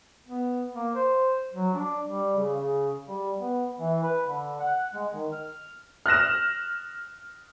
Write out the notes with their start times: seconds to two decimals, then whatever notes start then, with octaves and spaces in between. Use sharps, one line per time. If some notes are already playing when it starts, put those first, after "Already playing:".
0.27 B3
0.75 A#3
0.95 C5
1.53 F#3
1.74 D4
2.05 G3
2.36 C#3
2.56 C#3
3.08 G3
3.41 B3
3.79 E3
4.03 B4
4.27 D3
4.60 F#5
4.94 G#3
5.13 D#3
5.33 F6
6.06 F6 F#6 A#6 E7